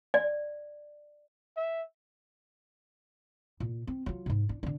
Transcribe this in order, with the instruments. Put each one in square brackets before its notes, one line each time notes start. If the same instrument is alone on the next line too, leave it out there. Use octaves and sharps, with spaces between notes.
[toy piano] D5
[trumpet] E5
[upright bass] A#2
C4
F#3 F4
G#2 C3
D4
D3 D4